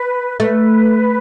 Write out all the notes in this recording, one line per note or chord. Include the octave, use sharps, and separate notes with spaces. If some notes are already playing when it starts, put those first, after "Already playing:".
Already playing: B4
A3 B4